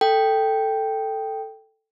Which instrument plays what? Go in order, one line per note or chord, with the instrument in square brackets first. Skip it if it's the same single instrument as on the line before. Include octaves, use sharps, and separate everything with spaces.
[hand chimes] A4 G5